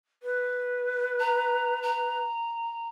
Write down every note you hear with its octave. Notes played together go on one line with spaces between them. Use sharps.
B4
A#5
A#5